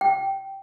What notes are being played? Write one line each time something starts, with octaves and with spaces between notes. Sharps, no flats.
G5